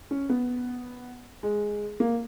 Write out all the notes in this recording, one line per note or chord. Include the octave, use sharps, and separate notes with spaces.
C#4
B3
G#3
A#3